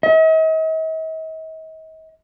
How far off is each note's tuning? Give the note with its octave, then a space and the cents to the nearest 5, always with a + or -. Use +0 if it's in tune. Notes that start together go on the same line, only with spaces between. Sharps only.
D#5 +45